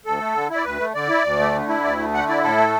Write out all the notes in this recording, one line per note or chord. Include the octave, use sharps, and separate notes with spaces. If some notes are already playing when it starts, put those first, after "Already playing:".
D2 A4
A3
D3
E4
D5
D2 B4
A3
D3 D5
E4
D2
A3
D3
E4
D2 D5
A3
D3 F#5
E4 D5
A2 A4
A3